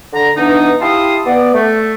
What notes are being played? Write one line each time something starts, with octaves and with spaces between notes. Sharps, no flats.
D3 A#5
E3 B3 D4 D#4
E4 G4 F5 A5 C6 D#6
B3 D5
A3